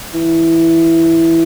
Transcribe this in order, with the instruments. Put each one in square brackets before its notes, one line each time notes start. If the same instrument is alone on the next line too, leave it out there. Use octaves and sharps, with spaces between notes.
[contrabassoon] E3